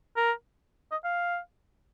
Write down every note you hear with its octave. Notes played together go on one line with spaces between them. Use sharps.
A#4
D#5
F5